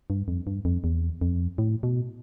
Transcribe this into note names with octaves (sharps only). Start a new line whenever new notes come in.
G2
F2
G2
F2
E2
F2
A2
B2